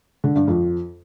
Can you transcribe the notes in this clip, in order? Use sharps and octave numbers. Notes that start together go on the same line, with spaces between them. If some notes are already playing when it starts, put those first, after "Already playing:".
D3
G2
F2